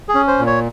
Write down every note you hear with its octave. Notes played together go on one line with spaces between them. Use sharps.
G#4
C#4
C5
A#2
C#5